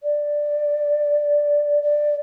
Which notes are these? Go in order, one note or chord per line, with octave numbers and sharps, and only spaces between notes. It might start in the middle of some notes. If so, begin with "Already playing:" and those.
D5
D5